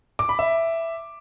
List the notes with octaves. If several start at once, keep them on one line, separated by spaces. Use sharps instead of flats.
D6
B5
E5